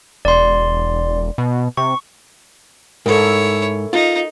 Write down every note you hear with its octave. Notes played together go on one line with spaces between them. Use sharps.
E1 D5 C6
B2
C3 C#6
G#2 E4 A4 A#4 C#5
D#4 F4